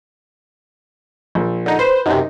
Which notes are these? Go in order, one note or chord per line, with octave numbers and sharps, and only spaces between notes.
A#1
D3 D#4
B4 C5
F#2 C3 D#4